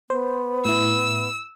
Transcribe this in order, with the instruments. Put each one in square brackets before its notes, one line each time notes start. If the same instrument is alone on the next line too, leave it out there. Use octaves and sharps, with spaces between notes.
[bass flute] B3 [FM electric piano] C5
[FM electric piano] A2 E4 [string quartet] E6